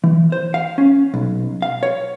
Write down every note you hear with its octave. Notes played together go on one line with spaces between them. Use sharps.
E3
C5
F5
C#4
B1
F5
C#5